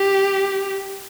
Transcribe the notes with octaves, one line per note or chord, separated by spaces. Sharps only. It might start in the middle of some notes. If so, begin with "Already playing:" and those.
Already playing: G4